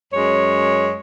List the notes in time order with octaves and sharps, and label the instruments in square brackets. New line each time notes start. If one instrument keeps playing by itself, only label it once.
[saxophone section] F#2 G#3 C#5